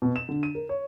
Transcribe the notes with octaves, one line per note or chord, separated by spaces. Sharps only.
B2
E7
D3
D#7
A#4
C#5